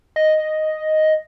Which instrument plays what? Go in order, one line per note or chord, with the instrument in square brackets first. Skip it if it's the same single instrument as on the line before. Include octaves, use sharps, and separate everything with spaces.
[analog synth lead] D#5